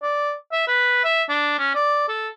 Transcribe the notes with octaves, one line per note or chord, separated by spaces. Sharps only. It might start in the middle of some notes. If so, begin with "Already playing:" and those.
D5
E5
B4
E5
D4
C#4
D5
A4